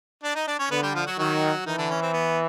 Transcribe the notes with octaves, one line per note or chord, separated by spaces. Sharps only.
D4 D5
D#4 D#5
D4 D5
C#4 C#5
D3 B3 B4
G3 G4
F3 F4
F#3 F#4
D#3 F#3 F#4
D#3 E3 D#4
D3 D4
C#4
C4
B3